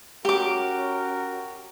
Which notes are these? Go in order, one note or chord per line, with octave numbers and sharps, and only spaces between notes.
C#4 F#4 G4 A#4 D6